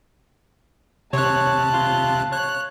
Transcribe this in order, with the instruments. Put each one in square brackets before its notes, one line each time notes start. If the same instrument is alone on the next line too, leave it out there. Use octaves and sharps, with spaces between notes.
[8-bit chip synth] C3 F#6 [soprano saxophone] C#5 [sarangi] A5
[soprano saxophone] F4
[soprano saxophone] C#5 [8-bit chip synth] F#6